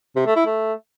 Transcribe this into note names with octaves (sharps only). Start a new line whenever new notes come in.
C3
A3
E4
A3